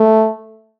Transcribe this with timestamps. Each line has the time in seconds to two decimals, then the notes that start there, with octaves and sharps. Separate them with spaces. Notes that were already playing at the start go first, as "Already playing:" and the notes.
Already playing: A3